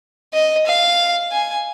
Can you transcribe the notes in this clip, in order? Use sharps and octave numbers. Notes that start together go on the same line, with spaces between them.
D#5
F5
G#5